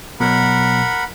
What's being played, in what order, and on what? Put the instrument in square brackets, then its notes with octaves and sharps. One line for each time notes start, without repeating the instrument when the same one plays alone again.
[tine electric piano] B2 F#3 [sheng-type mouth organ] A#4 F#5 B5